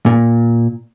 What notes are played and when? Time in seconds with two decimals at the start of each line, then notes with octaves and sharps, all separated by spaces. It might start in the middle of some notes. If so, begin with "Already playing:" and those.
0.06 A#2